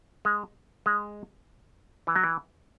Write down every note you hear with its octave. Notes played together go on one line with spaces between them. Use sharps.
G#3
G#3
E3
F#3
E3